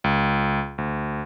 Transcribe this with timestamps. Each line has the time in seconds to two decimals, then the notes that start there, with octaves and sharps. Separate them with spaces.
0.04 C#2
0.78 D2